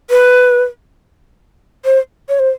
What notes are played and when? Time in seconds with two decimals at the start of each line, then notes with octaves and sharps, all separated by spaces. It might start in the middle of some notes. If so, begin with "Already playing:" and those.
0.10 B4
1.85 C5
2.29 C#5
2.39 C5